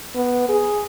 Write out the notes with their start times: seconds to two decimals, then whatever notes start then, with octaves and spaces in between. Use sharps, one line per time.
0.15 B3
0.49 G#4